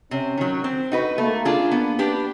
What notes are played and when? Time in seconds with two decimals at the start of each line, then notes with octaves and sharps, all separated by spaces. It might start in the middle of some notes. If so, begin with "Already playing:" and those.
0.11 C3 C#4
0.38 D#3 F#3
0.64 C4
0.92 D#4 F#4 B4
1.18 A3 A#3
1.45 D4 F4 G#4
1.71 B3
1.99 D4 G4 B4